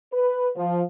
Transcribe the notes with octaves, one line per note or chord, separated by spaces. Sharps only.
B4
F3